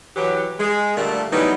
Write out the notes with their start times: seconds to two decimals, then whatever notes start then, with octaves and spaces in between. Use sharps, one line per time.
0.16 E3 F#3 G4
0.59 G#3
0.97 A#2 D3 G3 A3
1.32 E3 F#3 G3 A3 B3 D#4